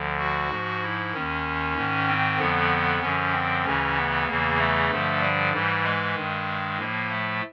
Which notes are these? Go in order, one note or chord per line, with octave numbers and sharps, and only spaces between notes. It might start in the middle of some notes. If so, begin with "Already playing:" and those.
Already playing: D2 D3 F3
F#4
G#2 F3
E4
D#2 D#3 C#4
G#2 D#3
C4
F2 D3 F3 B3
F#2 D3 F3 C#4
C4
D2 C#3 E3 C#4
B3
E2 C#3 E3 A#3
A3
G2 D3 F3
G3
G#2 E3 G3
G#3
G2 D#3
A2 F3 A#3
A3